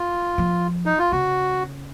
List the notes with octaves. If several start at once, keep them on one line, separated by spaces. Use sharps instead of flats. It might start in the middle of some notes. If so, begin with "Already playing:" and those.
Already playing: F4
F3
D#4
F4
C#3 F#4